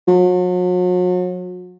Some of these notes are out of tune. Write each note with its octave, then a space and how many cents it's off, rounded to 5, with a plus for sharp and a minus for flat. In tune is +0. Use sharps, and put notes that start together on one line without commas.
F#3 -40